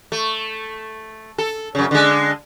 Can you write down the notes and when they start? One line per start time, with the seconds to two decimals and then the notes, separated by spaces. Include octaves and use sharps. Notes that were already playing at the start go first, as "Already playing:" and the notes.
0.12 A3
1.38 A4
1.75 F#2 C#3
1.91 D3 G#3